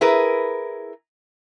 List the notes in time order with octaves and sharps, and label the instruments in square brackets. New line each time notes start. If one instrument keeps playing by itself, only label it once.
[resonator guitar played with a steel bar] E4 G#4 A#4 B4